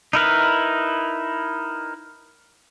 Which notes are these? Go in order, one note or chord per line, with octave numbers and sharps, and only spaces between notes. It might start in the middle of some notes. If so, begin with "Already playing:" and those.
D#4 E4 A#4 B4